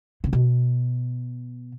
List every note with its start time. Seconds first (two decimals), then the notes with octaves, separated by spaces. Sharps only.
0.24 C#3
0.33 B2